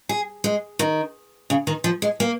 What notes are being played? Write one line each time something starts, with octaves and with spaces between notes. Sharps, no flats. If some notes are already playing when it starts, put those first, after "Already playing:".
G#4
G#3
D#3
C#3
D#3
F3
G#3
A#3